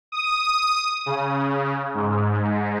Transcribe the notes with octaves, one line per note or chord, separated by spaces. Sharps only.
D#6
C#3
G#2